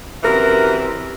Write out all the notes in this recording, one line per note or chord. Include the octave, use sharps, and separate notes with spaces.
F#2 C3 E3 A#4